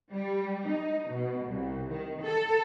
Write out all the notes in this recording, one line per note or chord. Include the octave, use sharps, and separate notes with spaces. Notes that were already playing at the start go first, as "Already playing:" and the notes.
G3
D#4
B2
C2
D#3
A4